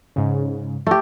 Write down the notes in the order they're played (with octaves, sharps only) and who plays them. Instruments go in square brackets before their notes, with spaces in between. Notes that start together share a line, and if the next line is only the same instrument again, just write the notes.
[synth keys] G#2 C#3
[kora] A3 G4